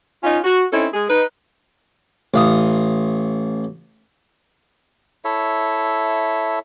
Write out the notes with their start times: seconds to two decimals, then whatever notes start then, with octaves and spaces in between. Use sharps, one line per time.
0.24 C#4 D#4 F4
0.44 F#4
0.72 C4 C#4 D#4 E4 A4
0.94 G#3 G#4
1.09 D#4 B4
2.34 A1 F5 D#6
5.24 E4 A4 C#5 E5